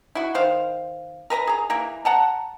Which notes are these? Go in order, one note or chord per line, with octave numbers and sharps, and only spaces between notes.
E4 F#4
D#3 C5 F5
A#4 B4 A5 A#5
G#4 A#5
E3 A#3 A#4
F#5 A5 A#5